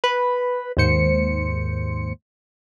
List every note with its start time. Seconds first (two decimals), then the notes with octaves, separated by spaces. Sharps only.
0.04 B4 B5
0.77 D#2 G#2 C5 C#7